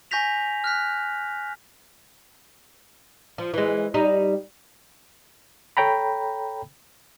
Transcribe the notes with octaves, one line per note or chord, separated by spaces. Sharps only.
G#5 C#6 G6 A#6 B6 F7
F6 F#6 B6
F3
E3 G#3
G3 D#4
A4 C#5 G5 A#5 B5